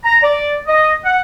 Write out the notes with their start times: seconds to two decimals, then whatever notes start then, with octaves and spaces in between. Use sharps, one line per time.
0.04 A#5
0.22 D5
0.67 D#5
1.05 F#5